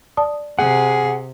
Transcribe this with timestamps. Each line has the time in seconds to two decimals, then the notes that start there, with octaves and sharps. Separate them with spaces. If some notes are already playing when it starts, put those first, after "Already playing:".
0.17 D5 A5 D#6
0.59 C3 G#4 F#5